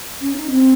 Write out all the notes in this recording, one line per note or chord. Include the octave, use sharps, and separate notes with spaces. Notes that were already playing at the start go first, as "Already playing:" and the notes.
C#4
D#4
C4